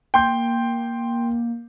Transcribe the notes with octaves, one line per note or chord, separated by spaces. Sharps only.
A#3 G5 C6 G6